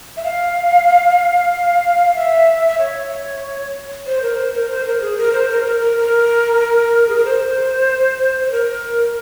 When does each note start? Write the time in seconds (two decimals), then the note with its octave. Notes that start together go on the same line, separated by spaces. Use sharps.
0.17 E5
0.23 F5
2.15 E5
2.67 E5
2.78 C#5
4.06 C5
4.22 A#4
4.38 C5
4.54 A#4
4.69 C5
4.85 A#4
5.01 G#4
5.17 A#4
5.33 C5
5.49 A#4
5.61 C5
5.65 A#4
5.81 A#4
5.97 A#4
7.09 G#4
7.16 A#4
7.25 C5
8.43 C5
8.51 A#4